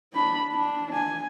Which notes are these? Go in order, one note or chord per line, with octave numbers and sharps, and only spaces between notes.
D4 B5
D4
G#5